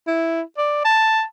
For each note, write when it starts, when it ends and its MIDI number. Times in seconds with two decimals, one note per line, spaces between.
0.07 0.42 64
0.58 0.80 74
0.85 1.22 81